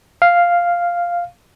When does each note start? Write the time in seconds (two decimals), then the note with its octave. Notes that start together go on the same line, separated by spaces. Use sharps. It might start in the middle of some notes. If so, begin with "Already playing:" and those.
0.22 F5